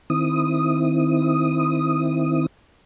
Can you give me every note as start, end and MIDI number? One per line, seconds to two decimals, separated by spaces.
0.10 2.46 51
0.10 2.46 60
0.10 2.46 64
0.10 2.46 87